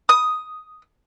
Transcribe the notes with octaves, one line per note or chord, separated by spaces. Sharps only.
D#6